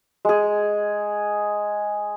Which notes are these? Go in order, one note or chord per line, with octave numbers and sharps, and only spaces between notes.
G#3 G#4